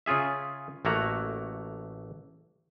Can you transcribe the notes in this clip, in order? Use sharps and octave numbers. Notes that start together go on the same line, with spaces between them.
C#3 C#4 F4 G#4 E5
A1 A3 A#3 F#4 A#5